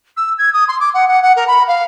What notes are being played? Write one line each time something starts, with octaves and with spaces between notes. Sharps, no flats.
E6
G#6
D#6
C6
D6
F#5
F#5
F#5
A#4
B5
F5